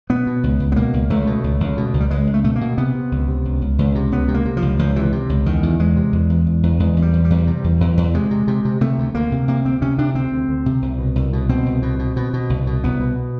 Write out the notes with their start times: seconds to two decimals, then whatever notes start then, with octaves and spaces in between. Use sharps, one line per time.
0.10 B2 B3
0.27 B2
0.44 C#2
0.60 C#2
0.72 B3
0.76 B2 A#3
0.93 C#2
1.10 C#2 A3
1.27 B2
1.44 C#2
1.60 C#2
1.77 B2
1.94 C#2
2.00 G3
2.11 C#2 G#3
2.27 C#2
2.34 A3
2.44 B2 A3
2.56 A#3
2.61 B2
2.78 C3 B3
2.95 C3
3.12 C#2
3.28 C3
3.45 C#2
3.61 C#2
3.79 C#2
3.95 C3
4.12 C#2 B3
4.28 C3
4.34 A#3
4.45 C3
4.57 F3
4.62 C#2
4.79 C#2 F3
4.96 C3 E3
5.12 C3
5.29 C#2
5.46 E2 D#3
5.63 E2
5.79 E2 G#3
5.96 C3
6.12 E2
6.30 E2
6.47 E2
6.63 E2
6.80 E2 G#3
6.97 E2
7.02 G3
7.14 E2
7.25 G3
7.30 E2
7.47 C3
7.64 E2
7.81 E2
7.97 E2
8.14 C3 G#3
8.31 C3
8.48 C3
8.65 C3
8.81 C3 A3
8.98 D2
9.15 D2 A#3
9.32 C3
9.48 C3 A#3
9.65 D2 C4
9.82 C3 C#4
9.98 C3 D4
10.15 D2 C4
10.32 D2
10.49 D2
10.66 C3
10.82 C2
10.98 B2
11.16 C2
11.33 B2
11.49 B2 C4
11.66 C2
11.82 B2
11.99 B2
12.16 B2
12.33 B2
12.50 C2
12.67 B2
12.84 C2 B3
13.00 B2